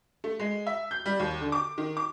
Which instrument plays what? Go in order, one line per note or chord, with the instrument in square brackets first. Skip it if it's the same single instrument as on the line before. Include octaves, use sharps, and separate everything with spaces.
[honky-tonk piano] A3
G#3
E5
G6
G3
D#2
D3
D6
D#3
D6